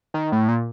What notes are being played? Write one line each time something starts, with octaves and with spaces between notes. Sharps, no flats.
D#3
A2
A#2